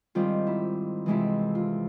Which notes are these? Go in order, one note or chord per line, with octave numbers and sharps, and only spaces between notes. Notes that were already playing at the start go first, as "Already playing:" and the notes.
G#2 D#3 G3 C4 F4
E4
F2 C3 E3 G#3 E4
F4